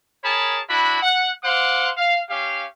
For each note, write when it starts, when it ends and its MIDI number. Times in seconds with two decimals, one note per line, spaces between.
0.23 0.59 68
0.23 0.59 70
0.23 0.59 73
0.23 0.59 81
0.23 0.59 83
0.69 0.99 62
0.69 0.99 64
0.69 0.99 66
0.69 0.99 83
1.02 1.31 78
1.43 1.90 72
1.43 1.90 77
1.43 1.90 78
1.43 1.90 84
1.43 1.90 86
1.96 2.20 77
2.30 2.65 61
2.30 2.65 67
2.30 2.65 77